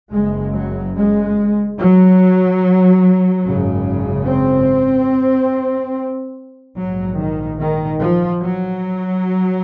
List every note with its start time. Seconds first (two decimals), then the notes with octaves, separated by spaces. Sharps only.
0.13 F#1 F#2 C#3 G#3
0.54 F#3
0.95 G#3
1.78 F#3
3.44 G#1 F#2 C#3
4.27 C4
6.76 A#1 G#2 F#3
7.17 D#3
7.59 D#3
8.00 F3
8.42 F#3